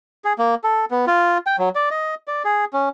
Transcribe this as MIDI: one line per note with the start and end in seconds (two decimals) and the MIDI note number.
0.25 0.33 68
0.39 0.55 58
0.64 0.85 69
0.91 1.05 59
1.07 1.38 65
1.47 1.56 79
1.59 1.69 54
1.75 1.89 74
1.91 2.15 75
2.28 2.43 74
2.45 2.65 68
2.73 2.89 61